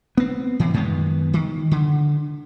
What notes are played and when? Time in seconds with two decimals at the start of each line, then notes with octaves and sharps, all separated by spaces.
0.17 B3 C4
0.59 A2 E3
0.74 F#2 D#3 G#3 B3
1.33 D#3
1.71 D3